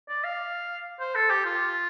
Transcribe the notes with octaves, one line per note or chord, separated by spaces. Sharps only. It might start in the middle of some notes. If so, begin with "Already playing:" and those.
D5
F5
C5
A4
G4
F4